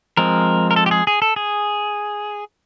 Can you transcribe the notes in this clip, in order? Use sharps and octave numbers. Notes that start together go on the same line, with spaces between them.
F3 G#3 C4 A#4
A#4
A4
G4
G#4
G#4
A4
G#4